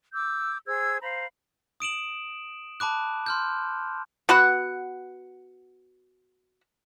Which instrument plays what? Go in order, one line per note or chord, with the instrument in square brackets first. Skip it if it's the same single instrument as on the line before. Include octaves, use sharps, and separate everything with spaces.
[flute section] D6 E6 G6
G#4 C5 E6 G#6
C5 F5 A#5 B5
[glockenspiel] D#6 D7 E7 F#7
A5 B5 D6 F#6
C6 F6 G6
[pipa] B3 F#4 B4 F#5